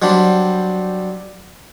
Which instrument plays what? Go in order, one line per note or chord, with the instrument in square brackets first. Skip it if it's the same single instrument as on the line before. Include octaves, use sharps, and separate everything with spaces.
[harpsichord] F#3 G3 C4 D4